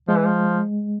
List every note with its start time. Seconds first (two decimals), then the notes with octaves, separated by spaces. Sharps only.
0.08 F3 G#3
0.17 E3
0.27 F3